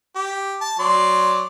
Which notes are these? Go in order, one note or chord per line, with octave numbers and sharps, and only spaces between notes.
G4
A5
F#3 D5 C6